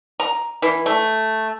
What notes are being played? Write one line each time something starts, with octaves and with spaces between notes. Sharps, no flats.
A#5
E3
A3